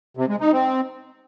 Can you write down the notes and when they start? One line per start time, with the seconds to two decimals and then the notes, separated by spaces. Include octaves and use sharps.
0.17 C3
0.29 G#3
0.41 D#4
0.52 C4